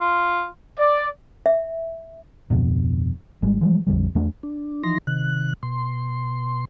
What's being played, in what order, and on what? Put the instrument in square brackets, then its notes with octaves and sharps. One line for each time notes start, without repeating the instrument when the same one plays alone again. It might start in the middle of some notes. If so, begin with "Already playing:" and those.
[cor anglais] F4
[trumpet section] D5
[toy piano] E5
[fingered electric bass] D1 F2 B2 D3
G#1 G3 G#3
E3 F3 G3 G#3
A#1 F2 D3 G3
E2 A3 D4
[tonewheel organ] D4
E3 F3 D#4 C6 A#6
C3 D#3 F#6
B2 C6